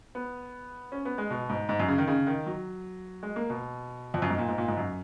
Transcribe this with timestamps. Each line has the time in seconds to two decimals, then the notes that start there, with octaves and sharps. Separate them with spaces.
0.15 B3
0.92 C#4
1.05 B3
1.18 G#3
1.30 B2
1.50 G#2
1.69 G#2
1.79 F#2
1.88 C#3
1.98 D#3
2.07 C#3
2.27 D#3
2.46 F#3
3.23 G#3
3.36 A#3
3.50 B2
4.14 F2
4.22 F#2
4.30 G#2
4.38 A#2
4.48 G#2
4.58 A#2
4.68 G#2
4.77 F#2